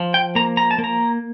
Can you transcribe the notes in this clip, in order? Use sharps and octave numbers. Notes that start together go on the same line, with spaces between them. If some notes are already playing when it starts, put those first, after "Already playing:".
Already playing: F3
G5
A#3 A#5
A#5
A5
A#3
A#5